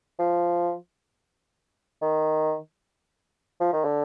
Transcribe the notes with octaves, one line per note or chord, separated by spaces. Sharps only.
F3
D#3
F3
D#3
D3